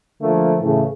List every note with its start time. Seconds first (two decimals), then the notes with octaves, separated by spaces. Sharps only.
0.21 D3 F3 A3 A#3
0.60 A2 C#3 E3 A3